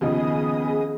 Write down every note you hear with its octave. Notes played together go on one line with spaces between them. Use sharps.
D#2 C#3 F3 B3 G#4 D#5 D#6